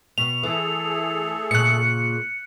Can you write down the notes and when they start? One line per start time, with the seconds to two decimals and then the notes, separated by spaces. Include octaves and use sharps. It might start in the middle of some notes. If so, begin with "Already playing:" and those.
0.18 B2 F7
0.43 E3 A3 G#4 A4
1.51 A#2 C#3 F#6 C#7